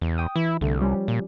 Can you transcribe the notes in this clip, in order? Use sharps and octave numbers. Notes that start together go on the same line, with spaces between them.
E2
G5 D#6
E3 E4
C2 D3 A3
F3 G3 C#4
A#2